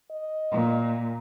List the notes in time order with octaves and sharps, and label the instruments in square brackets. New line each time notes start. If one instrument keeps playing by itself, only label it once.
[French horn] D#5
[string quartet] A#2